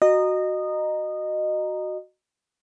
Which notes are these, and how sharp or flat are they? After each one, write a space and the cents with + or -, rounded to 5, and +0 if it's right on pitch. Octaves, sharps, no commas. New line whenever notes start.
F#4 +0 D#5 -20 A#5 +0